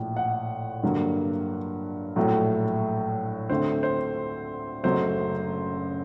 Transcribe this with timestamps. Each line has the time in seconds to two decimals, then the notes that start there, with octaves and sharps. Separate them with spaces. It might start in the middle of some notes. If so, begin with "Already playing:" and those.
Already playing: A#1 A2
0.17 F#5
0.83 G2 D3 F#3 A#3
2.16 A#1 A2 F#3 A3
3.50 D2 D3 A3 C4 C5
3.83 C5
4.83 F#1 F#2 F#3 A3 C5